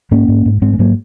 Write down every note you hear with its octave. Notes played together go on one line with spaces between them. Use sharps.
G#2 A#3 C#4
G#2
G#2
G#2 G#3 C4
G#3
G#2 F#3 A#3